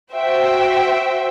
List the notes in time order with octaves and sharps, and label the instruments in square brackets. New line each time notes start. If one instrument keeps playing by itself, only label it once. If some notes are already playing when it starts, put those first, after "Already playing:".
[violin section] F#4 C5 E5 G5